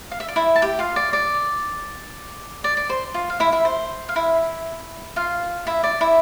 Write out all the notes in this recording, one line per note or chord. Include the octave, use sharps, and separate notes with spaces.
F5
E5
D5
E4 E5
A5
G4 G5
F4 F5
D5
D5
D5
D5
C5
F4
F5
E4 E5
E4 E5
C5
F5
E4 E5
F4 F5
E4 E5
D5
E4 E5